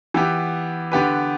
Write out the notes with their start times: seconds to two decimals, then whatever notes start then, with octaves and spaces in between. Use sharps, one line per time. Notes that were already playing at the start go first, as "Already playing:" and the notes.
0.14 E3 B3 G4
0.92 D3 B3 G4 B4